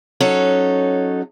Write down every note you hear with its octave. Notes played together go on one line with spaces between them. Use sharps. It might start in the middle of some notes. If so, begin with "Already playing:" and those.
F#3 C#4 D#4 A4